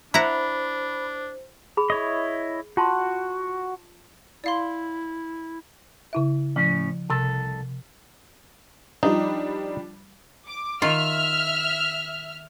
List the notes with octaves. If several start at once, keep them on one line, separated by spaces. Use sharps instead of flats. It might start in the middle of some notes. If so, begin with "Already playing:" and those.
D4 E4 C5 F#5 A#5 B5
G#4 B5
E4 C#5 D#5
F4 F#4 A5 C6
E4 D5 F5 C6
C#3 E4 E5
A2 F3 C#4
C2 C3 A4 E6
F3 G3 D4 D#4
D6
D#3 F4 E5 F6